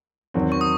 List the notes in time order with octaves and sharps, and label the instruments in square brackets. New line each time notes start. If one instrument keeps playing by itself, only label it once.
[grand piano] E2 D#3 F#3 C4 F#4
[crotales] C#6
D#6